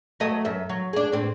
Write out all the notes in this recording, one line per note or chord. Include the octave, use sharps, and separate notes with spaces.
F#3 A3 D#5
F#2 E5
F#3
D4 G#4
A2 C4